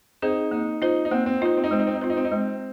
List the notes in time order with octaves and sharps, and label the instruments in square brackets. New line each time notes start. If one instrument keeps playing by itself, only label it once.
[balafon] C4 G#4 C5 [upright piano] D#4
[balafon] A#3 [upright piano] D#4
[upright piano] D#4 [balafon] F4 C5
[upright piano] D#4
[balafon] A#3 [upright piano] C4
[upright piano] C4
[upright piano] D#4 [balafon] F4 C5
[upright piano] C4
D#4
[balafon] G#3 [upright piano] C4
[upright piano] D#4
C4
D#4
[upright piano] C4 [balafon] F4 C5
[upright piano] D#4
C4
D#4
[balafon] G#3 [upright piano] C4